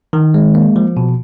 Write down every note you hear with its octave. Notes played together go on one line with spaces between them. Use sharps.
D#3
G#3
A#3
F3
B2